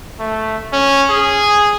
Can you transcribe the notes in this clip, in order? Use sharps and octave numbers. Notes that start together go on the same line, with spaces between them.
A3
C#4
G#4